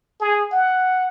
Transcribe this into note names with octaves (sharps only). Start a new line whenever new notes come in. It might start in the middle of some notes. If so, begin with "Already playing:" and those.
G#4
F#5